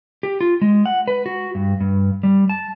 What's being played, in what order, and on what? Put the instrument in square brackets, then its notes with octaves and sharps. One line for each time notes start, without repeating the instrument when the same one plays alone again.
[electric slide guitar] G4
F4
G#3
F#5
B4
F#4
G2
G2
G3
A5